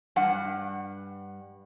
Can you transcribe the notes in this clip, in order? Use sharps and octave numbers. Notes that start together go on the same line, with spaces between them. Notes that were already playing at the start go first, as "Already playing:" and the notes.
G2 F#5